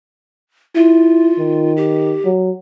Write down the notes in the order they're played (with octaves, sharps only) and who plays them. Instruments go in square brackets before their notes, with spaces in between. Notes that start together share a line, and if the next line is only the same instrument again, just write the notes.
[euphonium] E4 [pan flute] F4
[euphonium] D#3
[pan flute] G4
[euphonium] F#3